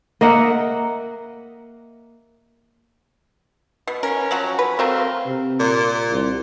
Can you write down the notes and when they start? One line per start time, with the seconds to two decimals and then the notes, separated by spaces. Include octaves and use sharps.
0.21 A#3 D#5 E5 F#5
3.87 B2 B4
4.03 C#4 A#4
4.31 F3 F#3 F#4 A#5
4.59 B4
4.79 F#3 A3 C4 A#4 F5
5.26 C3
5.60 A#2
6.11 C2